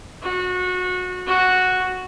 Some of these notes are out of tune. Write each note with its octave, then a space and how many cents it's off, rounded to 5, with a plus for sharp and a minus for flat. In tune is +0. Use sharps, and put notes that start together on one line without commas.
F#4 -25
F#4 -5